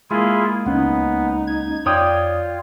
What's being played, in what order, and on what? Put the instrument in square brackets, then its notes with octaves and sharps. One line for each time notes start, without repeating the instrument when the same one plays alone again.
[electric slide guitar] G#3 A#3 [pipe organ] E4 F4 G#4
[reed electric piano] C#2 C#4 [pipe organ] B3 [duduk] D#4
[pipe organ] G#6
[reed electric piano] F2 D#6 [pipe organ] F4 [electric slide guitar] C#5 D5 G5